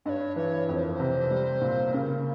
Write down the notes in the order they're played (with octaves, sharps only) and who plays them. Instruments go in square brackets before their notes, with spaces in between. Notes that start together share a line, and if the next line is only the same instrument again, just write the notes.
[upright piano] G2 [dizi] C#5 D#5
[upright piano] E3 [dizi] C#5
[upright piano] F2 [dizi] C#5
[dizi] C5
A#4
C5
[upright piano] C3
G3
A#2
[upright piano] C#3 [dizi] A#4